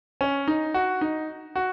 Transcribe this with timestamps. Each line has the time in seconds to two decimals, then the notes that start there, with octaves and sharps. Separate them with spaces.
0.21 C#4
0.48 D#4
0.74 F#4
1.01 D#4
1.56 F#4